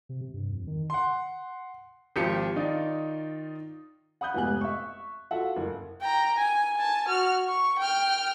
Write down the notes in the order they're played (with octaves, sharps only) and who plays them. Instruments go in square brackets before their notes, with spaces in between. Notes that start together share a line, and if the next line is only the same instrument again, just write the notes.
[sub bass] C3
C3
G2
F2
D#3
[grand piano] F#5 C6
G#1 F3 G4 C#7
D#3 D#4 F4 D5
[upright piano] F#5 B5 D#6 F#6 G6
F1 G#2 B3 G4 G#5 F#6
E5 C#6
F4 F#4 A4 E5 F#5
F#1
[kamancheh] G5 A#5
G#5
G#5 A5
F#4 F6
C#6
G5 F6